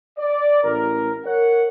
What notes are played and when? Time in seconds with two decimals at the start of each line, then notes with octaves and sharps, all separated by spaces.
0.18 D5
0.63 A1 A#4
1.26 A#4 C#5 F#5